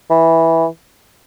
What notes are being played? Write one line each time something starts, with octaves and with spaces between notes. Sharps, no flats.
E3